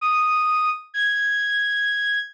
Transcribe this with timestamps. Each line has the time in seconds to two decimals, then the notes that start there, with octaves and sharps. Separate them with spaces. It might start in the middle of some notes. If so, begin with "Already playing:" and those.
0.01 D#6
0.94 G#6